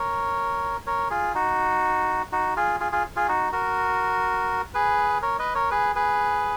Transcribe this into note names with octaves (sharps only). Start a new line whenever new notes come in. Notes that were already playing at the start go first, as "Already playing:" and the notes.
Already playing: A#4 C#5
A#4 C#5
F4 G#4
D#4 F#4
D#4 F#4
F4 G#4
F4 G#4
F4 G#4
F4 G#4
D#4 F#4
F#4 A#4
G#4 B4
A#4 C#5
B4 D#5
A#4 C#5
G#4 B4
G#4 B4